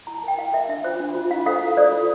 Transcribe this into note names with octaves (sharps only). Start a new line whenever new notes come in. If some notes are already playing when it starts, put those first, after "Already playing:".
E4 A#5
A5
A#4 G5
E4 F5
A#4 E5
D4 E5
F4 C5
D4
F4 C5
E4 F5
A4 C5 F5
E4
A4 C5 D5
F4